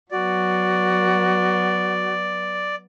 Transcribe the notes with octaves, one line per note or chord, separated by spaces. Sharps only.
F#3 B3 F#4 D5